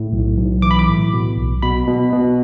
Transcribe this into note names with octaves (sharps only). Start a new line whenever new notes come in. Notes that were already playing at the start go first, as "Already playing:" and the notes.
Already playing: A2
B1
B1
E3 D6
B5
D6
A2
B2
B1
B2 B5
B2
B2